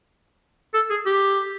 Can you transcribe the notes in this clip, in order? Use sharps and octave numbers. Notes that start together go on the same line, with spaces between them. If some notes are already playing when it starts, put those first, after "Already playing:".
A4
G#4
G4